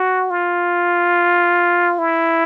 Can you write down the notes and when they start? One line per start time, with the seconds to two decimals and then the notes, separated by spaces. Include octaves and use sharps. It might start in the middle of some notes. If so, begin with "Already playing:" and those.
Already playing: F#4
0.30 F4
1.99 E4